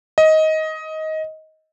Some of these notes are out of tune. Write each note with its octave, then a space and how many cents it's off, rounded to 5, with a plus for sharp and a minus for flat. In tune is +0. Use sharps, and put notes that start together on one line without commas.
D#5 +15